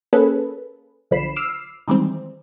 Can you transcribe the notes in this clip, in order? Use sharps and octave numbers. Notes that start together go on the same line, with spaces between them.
A#3 C#4 G#4 A4 B4
B1 D3 F3 B5 C7 E7
D6 E6 F6 C7
D#3 E3 G3 G#3 C4